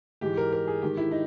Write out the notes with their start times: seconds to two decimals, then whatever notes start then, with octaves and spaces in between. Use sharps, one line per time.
0.21 G#2 E3 G4
0.37 A#4
0.52 A#4
0.67 G#4
0.82 G#2 D#3 G4
0.97 E4
1.11 D#4